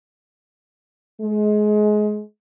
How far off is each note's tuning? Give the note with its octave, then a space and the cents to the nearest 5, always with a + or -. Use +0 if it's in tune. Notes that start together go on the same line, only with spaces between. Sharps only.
G#3 +25